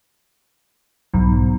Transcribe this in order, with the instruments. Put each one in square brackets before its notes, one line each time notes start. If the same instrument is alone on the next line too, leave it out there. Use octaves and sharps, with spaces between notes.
[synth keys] B1 [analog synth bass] G#2